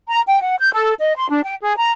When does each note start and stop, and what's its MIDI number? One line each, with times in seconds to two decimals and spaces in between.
0.10 0.21 82
0.26 0.39 79
0.41 0.55 78
0.59 0.71 91
0.73 0.95 69
0.99 1.14 75
1.17 1.30 84
1.30 1.41 62
1.43 1.55 79
1.62 1.76 68
1.78 1.91 82